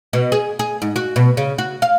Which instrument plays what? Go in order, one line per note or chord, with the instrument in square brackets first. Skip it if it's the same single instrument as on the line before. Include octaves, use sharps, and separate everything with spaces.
[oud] B2
G#4
G#4
G#2
F#4
B2
C#3
F#4
F5